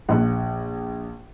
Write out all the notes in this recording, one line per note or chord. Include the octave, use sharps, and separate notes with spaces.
A#1 F#5